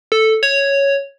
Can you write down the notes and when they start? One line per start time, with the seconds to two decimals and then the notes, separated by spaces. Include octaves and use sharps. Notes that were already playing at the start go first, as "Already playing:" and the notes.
0.12 A4
0.43 C#5